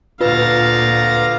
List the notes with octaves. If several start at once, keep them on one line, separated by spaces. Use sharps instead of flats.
D2 A#2 F4 B4 F5 A#5 A6